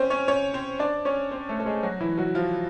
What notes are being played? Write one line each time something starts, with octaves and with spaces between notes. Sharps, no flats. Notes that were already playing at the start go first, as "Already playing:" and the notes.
Already playing: C4 C#4 C5
C#4 C#5
C#4 C#5
C4 C5
D4 D5
C#4 C#5
C4 C5
A3 A4
A4
G#3 G#4
F#3 F#4
E3 E4
F#3 F#4
F3 F4